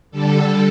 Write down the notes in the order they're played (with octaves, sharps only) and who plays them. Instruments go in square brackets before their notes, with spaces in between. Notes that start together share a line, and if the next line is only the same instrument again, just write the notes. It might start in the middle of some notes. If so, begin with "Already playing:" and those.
[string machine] D3 G3 A4